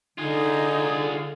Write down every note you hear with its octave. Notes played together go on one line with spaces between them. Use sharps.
D3 D#4 F4 G#4